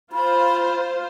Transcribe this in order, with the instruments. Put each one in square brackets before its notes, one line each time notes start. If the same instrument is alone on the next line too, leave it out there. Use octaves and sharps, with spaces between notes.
[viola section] F4 C5 [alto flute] B5